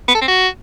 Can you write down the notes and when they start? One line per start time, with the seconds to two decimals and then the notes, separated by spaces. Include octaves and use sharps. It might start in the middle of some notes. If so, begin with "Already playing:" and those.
0.08 B3
0.15 A4
0.21 C4
0.28 F#4